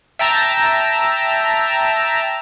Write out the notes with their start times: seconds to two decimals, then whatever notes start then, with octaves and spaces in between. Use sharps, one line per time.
0.19 E5 G5 A5 A#5 E6